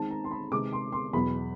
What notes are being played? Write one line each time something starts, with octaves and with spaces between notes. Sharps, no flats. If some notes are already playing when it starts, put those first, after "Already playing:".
Already playing: D#3 G#3 C4 D#4 A5
A#5
C6
B5
C3 D#3 G#3 B3 D6
C6
C6
E2 B2 F#3 B5